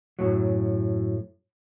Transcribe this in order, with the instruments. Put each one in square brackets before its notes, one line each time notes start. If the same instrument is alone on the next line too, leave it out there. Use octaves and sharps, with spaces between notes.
[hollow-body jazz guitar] F#2 A2 F#3